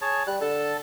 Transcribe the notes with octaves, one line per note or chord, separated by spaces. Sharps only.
G#4 C#5 A5
G3 F#6
D3 A4 A5